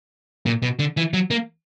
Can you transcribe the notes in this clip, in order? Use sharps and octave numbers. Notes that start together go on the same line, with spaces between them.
A#2
B2
D3
E3
F#3
A#3